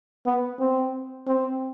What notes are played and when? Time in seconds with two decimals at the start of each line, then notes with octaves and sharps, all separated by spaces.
0.26 B3
0.60 C4
1.27 C4